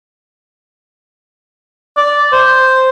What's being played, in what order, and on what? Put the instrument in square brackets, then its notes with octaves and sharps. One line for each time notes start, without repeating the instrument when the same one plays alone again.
[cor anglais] D5
C5